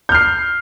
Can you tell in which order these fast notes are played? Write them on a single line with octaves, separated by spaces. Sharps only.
G6 F6 C7